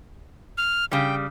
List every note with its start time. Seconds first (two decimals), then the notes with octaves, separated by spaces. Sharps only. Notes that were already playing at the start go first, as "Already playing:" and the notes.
0.58 F6
0.92 C#3 G3 G5